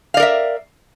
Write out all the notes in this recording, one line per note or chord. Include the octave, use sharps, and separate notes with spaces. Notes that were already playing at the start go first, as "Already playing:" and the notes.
A#4 D5 E5 F5